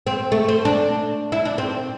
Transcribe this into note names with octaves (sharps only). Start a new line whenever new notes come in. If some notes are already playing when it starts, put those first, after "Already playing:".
C4
A3
C4
D4
E4
D4
C4